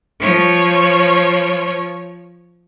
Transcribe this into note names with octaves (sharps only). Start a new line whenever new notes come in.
F3 C#5